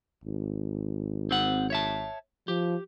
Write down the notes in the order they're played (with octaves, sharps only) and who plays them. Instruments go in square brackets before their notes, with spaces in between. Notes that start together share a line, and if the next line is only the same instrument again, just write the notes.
[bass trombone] G#1
[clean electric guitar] C4 F#5
C#5 E5 A5
[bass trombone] F3 [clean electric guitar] G4